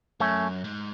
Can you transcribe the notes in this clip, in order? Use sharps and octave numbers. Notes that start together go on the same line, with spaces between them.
F#2 A3 C#4
G#2